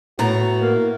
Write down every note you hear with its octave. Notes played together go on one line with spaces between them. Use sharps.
A2 B3 F#4 A#5
A#3